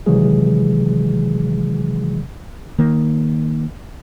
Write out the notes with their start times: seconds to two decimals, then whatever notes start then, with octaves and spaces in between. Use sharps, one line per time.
0.06 C3 D#3 E3 F#3 G#3 G#4
2.79 D#3 A#3